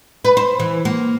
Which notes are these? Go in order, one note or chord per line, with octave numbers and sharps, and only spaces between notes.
B4
C5
E3
A#3